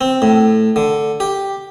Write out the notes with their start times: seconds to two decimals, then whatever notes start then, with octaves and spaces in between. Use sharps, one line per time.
0.01 C4
0.22 A2
0.76 D3
1.20 G4